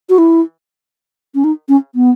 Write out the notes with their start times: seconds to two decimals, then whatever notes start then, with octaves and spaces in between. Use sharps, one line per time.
0.09 F#4
0.18 E4
1.35 C#4
1.44 D#4
1.69 C#4
1.95 B3